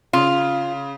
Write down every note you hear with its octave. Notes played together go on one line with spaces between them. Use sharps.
C#3 F4